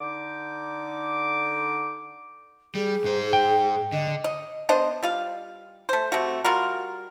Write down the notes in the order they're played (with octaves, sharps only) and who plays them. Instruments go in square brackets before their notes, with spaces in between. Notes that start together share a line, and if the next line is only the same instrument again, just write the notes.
[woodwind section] D3 D#4 D6
[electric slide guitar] G3 [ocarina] G#4
[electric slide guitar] G#2 C5
[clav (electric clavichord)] G5
[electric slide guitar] D3 [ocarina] D#5
[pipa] D#5
B3 D4 C5 D#5
G3 F4 F5
A3 C5
C3 A3 F#4
G3 F4 F#4 A#4